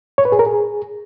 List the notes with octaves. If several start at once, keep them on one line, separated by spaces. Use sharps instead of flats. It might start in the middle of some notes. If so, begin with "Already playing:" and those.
C#5
B4
G#4
A#4
G#4